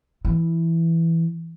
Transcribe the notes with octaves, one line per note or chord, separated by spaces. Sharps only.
E3